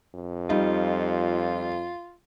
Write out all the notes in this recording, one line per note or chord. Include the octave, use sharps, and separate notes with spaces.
F2
G3 D#4 F4